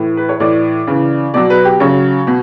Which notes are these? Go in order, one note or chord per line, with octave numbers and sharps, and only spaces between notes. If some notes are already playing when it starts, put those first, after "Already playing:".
Already playing: A2 E3
B4
C#5
A2 E3 D5
C#3 E3
B2 F#3 D5
B4
G4
C#3 F#3 C#5
B2